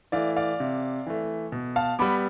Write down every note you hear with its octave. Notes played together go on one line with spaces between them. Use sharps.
E3 A3 D5 F5
D5 F5
C3
E3 A3
B2
F5 A5
G3 B3 B5 D6